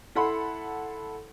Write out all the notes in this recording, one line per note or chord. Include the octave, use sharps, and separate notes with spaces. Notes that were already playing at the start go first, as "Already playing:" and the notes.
E4 A4 F#5 B5 C6